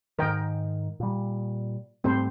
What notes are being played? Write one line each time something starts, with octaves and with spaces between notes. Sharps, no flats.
G#2 D#3 A#4 D#5 G5
A#2 G3
G#2 G3 A3 C4 C5